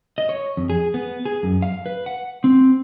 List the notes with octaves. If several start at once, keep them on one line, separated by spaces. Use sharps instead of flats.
D#5
C#5
F2
G#4
B3
G#4
F#2
F5
B4
F#5
C4